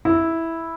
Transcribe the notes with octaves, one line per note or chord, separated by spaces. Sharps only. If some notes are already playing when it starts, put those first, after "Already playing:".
E4